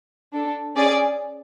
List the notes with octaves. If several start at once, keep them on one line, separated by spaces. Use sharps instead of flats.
D4 A4
C#4 G#4 D5